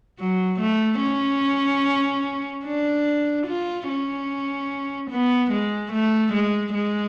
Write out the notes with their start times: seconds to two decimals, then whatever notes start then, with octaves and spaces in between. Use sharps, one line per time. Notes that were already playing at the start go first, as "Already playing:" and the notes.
0.19 F#3
0.60 A3
1.02 C#4
2.65 D4
3.47 F4
3.88 C#4
5.11 B3
5.52 G#3
5.93 A3
6.33 G#3
6.74 G#3